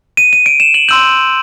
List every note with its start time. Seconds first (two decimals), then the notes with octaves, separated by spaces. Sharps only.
0.17 D#7
0.33 D#7
0.46 D7
0.60 E7
0.74 F#7
0.89 C6 E6 G6 F#7